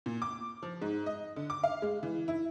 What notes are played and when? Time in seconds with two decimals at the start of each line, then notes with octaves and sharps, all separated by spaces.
0.06 A#2
0.22 D6
0.63 F3
0.82 G#2
1.06 D#5
1.36 D3
1.50 D6
1.64 F5
1.82 G#3
2.03 E3
2.28 E4